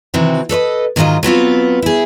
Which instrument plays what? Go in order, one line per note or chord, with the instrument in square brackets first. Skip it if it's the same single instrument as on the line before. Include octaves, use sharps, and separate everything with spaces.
[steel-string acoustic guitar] C3 D#3 E3 C4 F#4
A4 B4 C#5 D#5
G#2 D#3 F#3 C4 F4 D#5
F#3 B3 C4 F4
E4 G#4